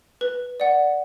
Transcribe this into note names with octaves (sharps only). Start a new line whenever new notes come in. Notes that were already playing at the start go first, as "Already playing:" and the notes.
B4
D5 F#5